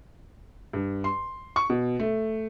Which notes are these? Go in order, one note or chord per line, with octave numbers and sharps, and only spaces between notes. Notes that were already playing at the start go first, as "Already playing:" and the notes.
G2
C6
C#6
B2
A3